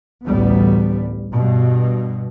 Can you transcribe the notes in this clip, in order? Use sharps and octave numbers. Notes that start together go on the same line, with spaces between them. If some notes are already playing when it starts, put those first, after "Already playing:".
A1 D2 G3 B3
G2 B2